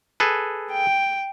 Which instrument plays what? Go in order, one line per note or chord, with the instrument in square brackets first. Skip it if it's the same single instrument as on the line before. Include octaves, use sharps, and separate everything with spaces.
[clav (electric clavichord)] G#4 A4 B4
[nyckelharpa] G5